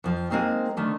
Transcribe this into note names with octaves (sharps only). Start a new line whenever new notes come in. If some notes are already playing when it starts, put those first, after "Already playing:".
F2 F3
G#3 A#3 C4 D#4 G4
D3 D#3 A3